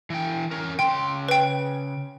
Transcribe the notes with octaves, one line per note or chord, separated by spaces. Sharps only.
E3 G5
C#4 A#4
C#3 G5 C6
B4 G5